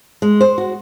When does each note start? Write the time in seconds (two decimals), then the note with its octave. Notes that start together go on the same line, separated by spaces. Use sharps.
0.22 G#3
0.41 C5
0.58 F#4